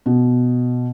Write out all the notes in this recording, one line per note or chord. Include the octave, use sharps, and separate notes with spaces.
B2